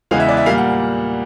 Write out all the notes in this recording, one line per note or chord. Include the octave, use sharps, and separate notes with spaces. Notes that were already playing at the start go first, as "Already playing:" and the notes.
E2 C#3 E3 G#3 B3 F5
E5
D5
E5
A#2 G3 A#3 F5
F#5